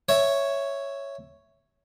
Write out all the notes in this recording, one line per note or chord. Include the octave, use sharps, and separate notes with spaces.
C#5 E5